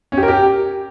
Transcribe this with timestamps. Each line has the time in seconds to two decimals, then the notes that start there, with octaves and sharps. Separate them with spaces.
0.12 C#4
0.17 G4
0.23 A#4
0.28 G4